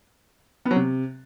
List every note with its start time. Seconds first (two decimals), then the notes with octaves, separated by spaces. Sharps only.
0.65 B3
0.71 F#3
0.76 C3